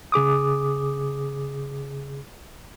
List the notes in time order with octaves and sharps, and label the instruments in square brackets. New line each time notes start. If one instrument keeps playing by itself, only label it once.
[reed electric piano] C#3 G#4 D6 D#6